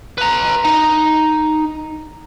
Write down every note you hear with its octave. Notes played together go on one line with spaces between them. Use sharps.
B4 A#5
D#4